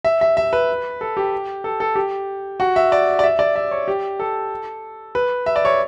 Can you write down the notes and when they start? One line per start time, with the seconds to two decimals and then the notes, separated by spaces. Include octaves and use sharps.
0.05 E5
0.21 E5
0.37 E5
0.53 B4
1.01 A4
1.17 G4
1.64 A4
1.80 A4
1.95 G4
2.60 F#4
2.76 E5
2.92 D5
3.19 D5
3.24 E5
3.39 D5
3.56 E5
3.71 C#5
3.88 G4
4.20 A4
5.15 B4
5.46 E5
5.56 D5
5.65 C#5